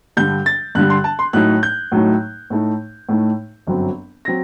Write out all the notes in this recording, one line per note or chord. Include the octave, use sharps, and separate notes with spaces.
G2 D3 G3 G6
A6
G2 D3 G3 F#6
C6
A5
C6
A2 F#3 A3 D#4 F#6
G6
A2 F#3 A3 D#4
A2 A3 D#4
A2 A3 D#4
G1 F#2 F#3 C4
F#3 C4 A#6